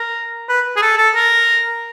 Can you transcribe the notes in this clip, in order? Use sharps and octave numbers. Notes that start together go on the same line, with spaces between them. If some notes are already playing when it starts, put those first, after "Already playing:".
Already playing: A#4
B4
G#4
A4
A4
A#4